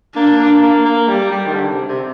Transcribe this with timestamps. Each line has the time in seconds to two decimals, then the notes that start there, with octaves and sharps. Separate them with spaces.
0.16 A#3 D4
0.39 A#3
0.62 A#3
0.85 A#3
1.08 G3
1.31 G3
1.46 D#3
1.54 D3
1.71 C3
1.89 C3